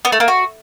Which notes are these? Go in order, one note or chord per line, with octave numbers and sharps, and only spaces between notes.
B3
A3
A#3
F#4